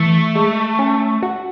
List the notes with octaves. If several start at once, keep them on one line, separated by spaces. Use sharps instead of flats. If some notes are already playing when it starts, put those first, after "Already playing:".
Already playing: E3 A3
G#3
C#4
F#4